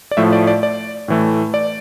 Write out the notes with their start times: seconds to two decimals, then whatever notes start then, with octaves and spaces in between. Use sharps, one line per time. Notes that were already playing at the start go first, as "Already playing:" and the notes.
0.11 D5
0.17 A2 F3 A3 E5
0.33 D5
0.47 D5
0.63 D5
1.08 A2 E3 A3
1.54 D5